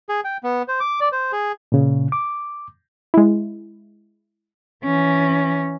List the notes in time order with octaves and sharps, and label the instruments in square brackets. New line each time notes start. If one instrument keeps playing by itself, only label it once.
[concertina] G#4
G5
B3
C5
D6
D5
C5
G#4
[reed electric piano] A#2 C#3
D6
[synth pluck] G#3 E4
[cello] E3 C#4